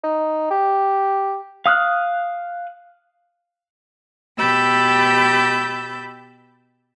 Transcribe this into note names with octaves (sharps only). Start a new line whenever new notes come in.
D#4
G4
F5 D#6 F6 F#6
B2 G4 B5 E6 G6 A6